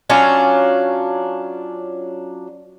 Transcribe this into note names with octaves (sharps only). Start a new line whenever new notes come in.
F#3 C#4 D4 F4